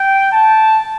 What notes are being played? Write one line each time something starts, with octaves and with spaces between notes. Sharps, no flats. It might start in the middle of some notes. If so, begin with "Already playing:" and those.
Already playing: G5
A5